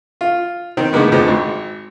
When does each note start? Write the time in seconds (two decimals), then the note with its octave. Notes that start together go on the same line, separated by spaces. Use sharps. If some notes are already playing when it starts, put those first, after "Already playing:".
0.21 F4
0.77 D#3 C4
0.93 A2 D3 G#3 A#3 B3
1.12 F2 D3 F3 G#3
1.28 G#1